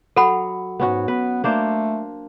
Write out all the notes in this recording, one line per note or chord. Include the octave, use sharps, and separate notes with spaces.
F#3 A4 F#5 B5
G#2 B3 C#4 F#4
B3 B4
A3 A#3 D4 C5